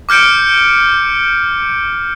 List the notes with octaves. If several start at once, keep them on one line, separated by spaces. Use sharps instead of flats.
D6 F6 G6 C#7 D7